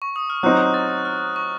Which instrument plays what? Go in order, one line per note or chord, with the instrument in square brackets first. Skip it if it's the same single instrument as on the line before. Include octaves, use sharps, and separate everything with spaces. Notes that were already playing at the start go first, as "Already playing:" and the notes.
[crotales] C#6
D#6
F6
[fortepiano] F#3 C4 D#4 [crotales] F#6
[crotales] A6
F6
C#6